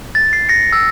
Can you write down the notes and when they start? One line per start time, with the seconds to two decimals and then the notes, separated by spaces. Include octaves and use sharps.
0.15 A6
0.33 C7
0.49 A#6 C#7
0.73 E6